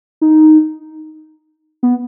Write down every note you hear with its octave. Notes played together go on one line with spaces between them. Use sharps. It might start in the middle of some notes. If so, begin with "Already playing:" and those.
D#4
B3